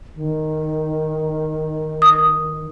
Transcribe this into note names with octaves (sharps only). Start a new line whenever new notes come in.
D#3
D#6